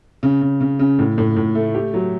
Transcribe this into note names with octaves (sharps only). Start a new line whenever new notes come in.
C#3
C#3
C#3
C#3
A2
A2
A2
A3
G4
F#3